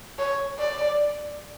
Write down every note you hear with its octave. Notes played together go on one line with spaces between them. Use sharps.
C#5
D5